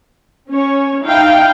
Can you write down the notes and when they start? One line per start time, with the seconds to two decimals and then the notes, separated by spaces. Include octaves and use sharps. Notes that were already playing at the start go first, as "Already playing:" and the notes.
0.50 C#4 C#5
1.02 D#4 E4 F5 G5